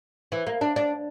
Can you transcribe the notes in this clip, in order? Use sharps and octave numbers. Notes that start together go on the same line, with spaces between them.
E3
A#3
D4
D4